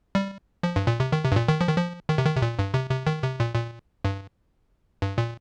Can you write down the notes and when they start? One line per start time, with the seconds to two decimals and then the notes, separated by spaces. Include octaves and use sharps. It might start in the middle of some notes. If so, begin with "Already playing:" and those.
0.15 G3
0.63 F3
0.76 G2
0.87 A#2
1.00 C3
1.12 D#3
1.24 C3
1.32 G2
1.36 A#2
1.48 D#3
1.61 F3
1.68 D#3
1.77 F3
2.09 D#3
2.18 C3
2.26 D#3
2.37 C3
2.42 A#2
2.59 G2
2.74 C3
2.90 C3
3.07 D#3
3.23 C3
3.40 A#2
3.55 A#2
4.05 G2
5.02 G2
5.18 A#2